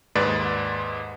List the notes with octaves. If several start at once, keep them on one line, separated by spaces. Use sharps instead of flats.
D#2 G#2 B4 D5 C6 A6